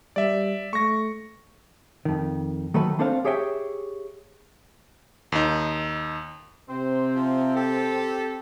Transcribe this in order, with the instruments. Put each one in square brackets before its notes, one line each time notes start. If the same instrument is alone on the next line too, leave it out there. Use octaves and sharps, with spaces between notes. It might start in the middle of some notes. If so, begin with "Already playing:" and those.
[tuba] G3 [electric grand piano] D5 E5
[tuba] A3 [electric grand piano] C#6 A#6
[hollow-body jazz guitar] F2 D#3
D#3 F#3 A3 A4 B4
A3 C4 D4 A4 C5 F5
G4 G#4 C#5 E5 G5
[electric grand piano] D#2 D#4
[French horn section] C3 [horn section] C4 [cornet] C5
[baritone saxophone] F3
[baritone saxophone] G4 [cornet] A4